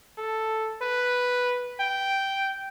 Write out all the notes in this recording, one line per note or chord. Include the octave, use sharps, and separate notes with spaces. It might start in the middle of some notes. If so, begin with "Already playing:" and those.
A4
B4
G5